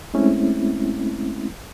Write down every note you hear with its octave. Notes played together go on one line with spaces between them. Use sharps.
G#3 A3 C4 C#4 E4